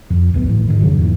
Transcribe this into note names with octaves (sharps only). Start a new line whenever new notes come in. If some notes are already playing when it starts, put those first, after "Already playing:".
F2
D1 A#1 E2 B3
G1 A2 E3
D1 G#2 D#3
F1 C#3 F#3 D4
E2 G#2 E3 A#3